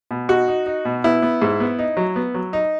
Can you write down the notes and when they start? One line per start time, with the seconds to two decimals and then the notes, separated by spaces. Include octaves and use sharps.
0.11 B2
0.29 D#4 F#4
0.48 D#4
0.66 D#4
0.85 B2
1.04 B3 E4
1.22 B3
1.42 G#2
1.60 B3
1.79 D#4
1.97 F#3
2.16 B3
2.34 F#3
2.53 D#4